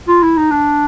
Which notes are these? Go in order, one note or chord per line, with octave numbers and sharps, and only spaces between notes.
F4
E4
D#4
D4